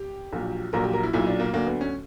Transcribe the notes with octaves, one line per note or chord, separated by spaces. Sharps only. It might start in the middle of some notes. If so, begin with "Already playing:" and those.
Already playing: G4
A#1 A#2 F#3
A#1 A#2 F#3 A#4
G4
A#4
E4
B1 A#2 F#3 E4
D4
A#3
D2 D3 F#3 A#3
B3
C#4